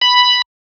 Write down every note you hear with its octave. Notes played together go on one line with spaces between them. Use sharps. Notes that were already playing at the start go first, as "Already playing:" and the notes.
B5